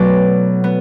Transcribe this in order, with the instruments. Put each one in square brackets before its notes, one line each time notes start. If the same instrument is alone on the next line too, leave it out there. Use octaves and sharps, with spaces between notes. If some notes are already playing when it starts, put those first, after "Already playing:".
Already playing: [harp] B2 F#3 A3 B3 D5
B3